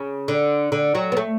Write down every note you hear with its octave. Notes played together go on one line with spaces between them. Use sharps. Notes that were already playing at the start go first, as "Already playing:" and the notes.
Already playing: C#3
D3
D3
F#3
B3
A3